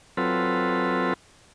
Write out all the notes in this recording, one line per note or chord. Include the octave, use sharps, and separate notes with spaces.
F#3 C4 F4 A4 B4